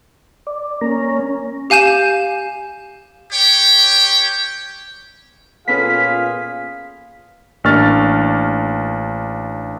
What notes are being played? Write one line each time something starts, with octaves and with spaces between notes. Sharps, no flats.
D5
A#3 C#4 A#5
G4 F5 G#5 G6 E7
G4 C#5 G5
A#2 B3 C#4 F4 G#4 A4 F5 B6
A1 A#3 D4 C#6 F6 A6